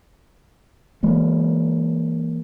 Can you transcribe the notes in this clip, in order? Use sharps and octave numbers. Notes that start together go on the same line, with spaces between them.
E3 G#3 A#3